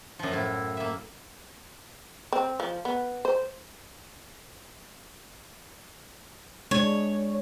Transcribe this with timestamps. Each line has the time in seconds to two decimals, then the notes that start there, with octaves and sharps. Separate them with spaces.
0.19 F#2 F3
0.32 A2 E4
0.77 A#3 E5
2.32 C4
2.60 F3
2.85 B3
3.25 C5
6.71 G#3 D4 C#5